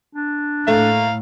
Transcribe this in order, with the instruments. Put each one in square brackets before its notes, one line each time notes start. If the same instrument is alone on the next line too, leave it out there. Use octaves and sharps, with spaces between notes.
[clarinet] D4
[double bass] A2 [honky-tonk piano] A3 [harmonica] F5 A#5